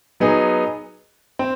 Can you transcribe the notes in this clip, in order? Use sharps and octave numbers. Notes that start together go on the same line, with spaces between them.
F#3 B3 D#4 G#4
C4